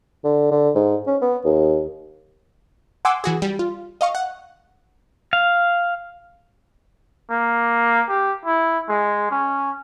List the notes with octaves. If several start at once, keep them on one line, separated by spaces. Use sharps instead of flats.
D3
D3
G#2
C#4
B3
D#2
F#5 G#5 C6 D6 E6
E3 F#4 G#4
G3
F4
D#5 F5 C#6
F#5
F5
A#3
G4
E4
G#3
C#4